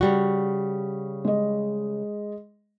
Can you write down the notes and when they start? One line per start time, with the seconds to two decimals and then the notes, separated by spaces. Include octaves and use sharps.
0.01 C#3 G3 F#4
1.25 G#3 D#5